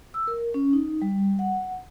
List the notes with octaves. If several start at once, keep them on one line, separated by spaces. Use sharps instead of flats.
E6
A#4
C#4
D#4
G3
F#5